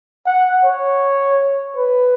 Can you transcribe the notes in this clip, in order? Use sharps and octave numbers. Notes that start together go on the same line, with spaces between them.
F#5
C#5
B4